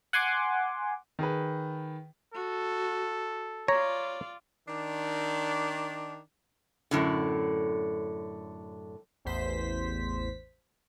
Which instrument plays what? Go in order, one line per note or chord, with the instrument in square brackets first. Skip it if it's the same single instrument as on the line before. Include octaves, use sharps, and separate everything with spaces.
[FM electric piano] F#5 G#5 C6 D6
[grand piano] D#3 G#4 B4
[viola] F#4 [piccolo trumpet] A4
[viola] F4 D5 [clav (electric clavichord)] C#5 A#5
[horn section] D#3 D4
[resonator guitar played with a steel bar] F#2 A2 D3
[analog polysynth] A1 E2 C5 B6